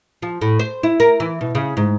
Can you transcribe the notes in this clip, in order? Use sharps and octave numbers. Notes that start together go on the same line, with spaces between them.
F3
A2
C5
E4
A#4
E3
B2
C#3
G#2